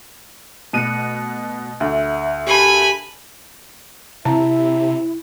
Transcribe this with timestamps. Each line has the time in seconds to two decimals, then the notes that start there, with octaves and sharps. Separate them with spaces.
0.73 B2 A3 F#6 C#7 D#7
1.80 D2 E5
2.47 G4 A#4 G#5 A5 B5
4.25 C3 E4 E5 A5 A#5